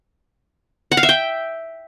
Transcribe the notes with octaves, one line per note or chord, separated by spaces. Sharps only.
F#5
F5
E5
G5